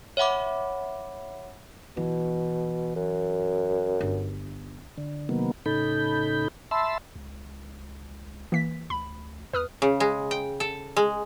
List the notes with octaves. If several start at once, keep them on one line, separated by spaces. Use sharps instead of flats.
C#5 E5 F#5 B5 D6
B2 E3
F#2
G1
D3
C3 D#3 F#3 A#3 B3
A2 C#3 D#4 A4 B5 G6
E5 A5 B5 C6 E6
C#2
E3 A#3 B6
D2 B5
E2 B4 D#6 F6
C#3
G#3
G5
A4
G#3